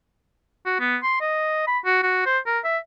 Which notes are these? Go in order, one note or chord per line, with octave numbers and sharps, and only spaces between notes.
F#4
B3
C6
D#5
B5
F#4
F#4
C5
A#4
E5